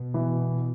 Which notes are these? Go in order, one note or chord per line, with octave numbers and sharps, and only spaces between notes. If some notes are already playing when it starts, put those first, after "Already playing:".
Already playing: B2
E3